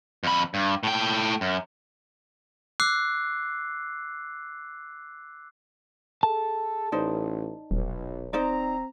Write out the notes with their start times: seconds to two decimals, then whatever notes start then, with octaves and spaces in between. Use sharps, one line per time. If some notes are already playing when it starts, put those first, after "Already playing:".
0.23 F2 B5
0.54 G2
0.83 A2 G5
1.41 F#2
2.80 D6 E6 F#6 C7
6.23 G#4 A4 A5
6.92 A1 D#4 C5 D5
7.71 D#1 B1
8.33 C4 D#4 C5 D5 A#5